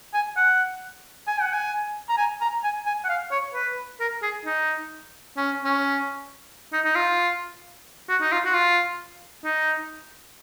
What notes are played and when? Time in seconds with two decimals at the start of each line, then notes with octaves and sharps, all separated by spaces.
0.14 G#5
0.36 F#5
1.27 G#5
1.41 F#5
1.53 G#5
2.09 A#5
2.18 G#5
2.41 A#5
2.64 G#5
2.86 G#5
3.05 F#5
3.09 F5
3.31 C#5
3.54 B4
4.00 A#4
4.22 G#4
4.45 D#4
5.37 C#4
5.65 C#4
6.73 D#4
6.85 D#4
6.95 F4
8.09 F#4
8.21 D#4
8.32 F4
8.45 F#4
8.54 F4
9.45 D#4